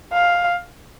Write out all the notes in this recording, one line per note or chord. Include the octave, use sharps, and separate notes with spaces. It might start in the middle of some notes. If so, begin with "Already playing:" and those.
F5